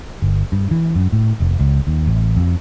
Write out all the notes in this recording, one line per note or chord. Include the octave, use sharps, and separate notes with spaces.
G1
G2
E3
F#2
A2
F1
C#2
D#2
A1
F2